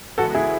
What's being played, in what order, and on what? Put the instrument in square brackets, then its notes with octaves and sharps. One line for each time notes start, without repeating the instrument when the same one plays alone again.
[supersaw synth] C#3 E3 G#3 B3 [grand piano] F#4 A4
[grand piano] E4 G#4